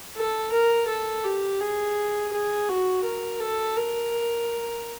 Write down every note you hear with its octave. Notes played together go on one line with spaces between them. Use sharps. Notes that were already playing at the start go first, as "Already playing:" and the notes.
A4
A#4
A4
G4
G#4
G#4
F#4
A#4
A4
A#4